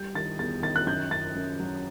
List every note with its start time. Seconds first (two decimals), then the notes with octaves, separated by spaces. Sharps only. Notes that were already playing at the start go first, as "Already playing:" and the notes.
Already playing: G3 G6
0.15 D#3 A6
0.39 E2 A6
0.62 D#3 A6
0.76 F#6
0.87 F#2 G6
1.11 F#2 A6
1.35 F#2
1.60 F#3